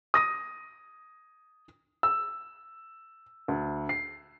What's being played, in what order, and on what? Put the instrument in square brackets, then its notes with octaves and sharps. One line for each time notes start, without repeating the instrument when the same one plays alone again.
[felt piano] D#6 A#6 D#7
[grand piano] E6
D2
C7